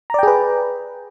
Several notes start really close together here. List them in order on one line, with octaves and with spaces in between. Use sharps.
A#5 D5 G5 G#4 B4